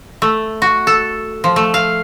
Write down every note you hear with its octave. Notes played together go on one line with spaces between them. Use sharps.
A3
F#4
A4
F3
A3
F5